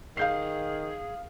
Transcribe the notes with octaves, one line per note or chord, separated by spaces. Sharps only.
D#3 G#4 F5 G6 C7